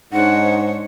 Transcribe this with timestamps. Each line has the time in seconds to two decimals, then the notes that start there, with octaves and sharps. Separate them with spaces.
0.12 G#2 D4 D#4 C5 C#5 F#5